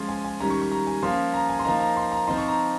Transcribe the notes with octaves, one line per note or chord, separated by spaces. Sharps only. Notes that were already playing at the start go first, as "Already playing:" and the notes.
Already playing: F3 G#3 C#4 C6
G#5
G#5
D#3 G3 C#4 A#5
C#6
C#6
A#5
G#5
F3 A#3 C#4 C6
A#5
G#5
C6
F3 A#3 D#4 A#5
A#5
C6
A#5
F3 C4 D#4 C6
C#6
A#5